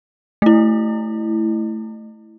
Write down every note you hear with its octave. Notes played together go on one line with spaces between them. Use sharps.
A3 E4